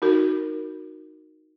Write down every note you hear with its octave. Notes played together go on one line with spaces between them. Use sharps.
D#4 F#4 A#4